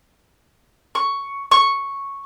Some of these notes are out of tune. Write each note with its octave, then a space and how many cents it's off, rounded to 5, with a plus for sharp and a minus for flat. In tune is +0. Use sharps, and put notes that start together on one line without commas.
C#6 +5
C#6 -5